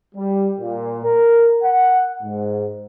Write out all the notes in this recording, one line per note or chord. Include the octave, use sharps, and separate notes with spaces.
G3
A#2
A#4
F#5
G#2